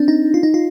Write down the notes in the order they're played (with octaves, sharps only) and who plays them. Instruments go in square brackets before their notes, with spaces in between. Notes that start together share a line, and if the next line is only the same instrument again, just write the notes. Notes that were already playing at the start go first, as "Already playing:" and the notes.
Already playing: [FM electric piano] C4 D4
D#4
F4
D#4
F4